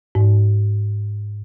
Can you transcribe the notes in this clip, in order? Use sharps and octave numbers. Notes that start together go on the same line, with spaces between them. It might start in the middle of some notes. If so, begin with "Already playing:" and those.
G#2